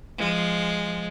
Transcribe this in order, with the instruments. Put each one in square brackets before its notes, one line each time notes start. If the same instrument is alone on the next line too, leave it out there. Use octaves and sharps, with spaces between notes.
[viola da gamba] F3 [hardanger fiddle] G#3